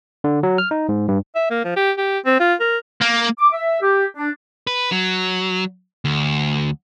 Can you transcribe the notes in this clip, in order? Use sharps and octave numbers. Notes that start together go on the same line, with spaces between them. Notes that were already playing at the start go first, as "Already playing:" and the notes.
D3
F#3
F6
D#4
G#2
G2
E5
A#3
F3
G4
G4
C4
F4
A#4
A#3
D6
E5
G4
D4
B4
F#3
D2